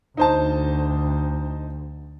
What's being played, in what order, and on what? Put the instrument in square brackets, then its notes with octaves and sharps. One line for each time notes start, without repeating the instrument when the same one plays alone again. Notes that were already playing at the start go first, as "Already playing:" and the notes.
[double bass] D2 [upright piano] D#4 C5 A5